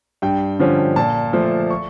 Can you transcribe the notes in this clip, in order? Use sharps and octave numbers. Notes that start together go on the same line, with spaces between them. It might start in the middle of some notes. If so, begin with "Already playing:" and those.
G2 G5
D3 F3 C#4
A#2 A5
F3 A3
C#6